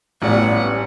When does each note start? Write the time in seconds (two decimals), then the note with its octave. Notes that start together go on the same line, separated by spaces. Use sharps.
0.22 A1 G3 B3 C#4 F4 G4 D5 F#5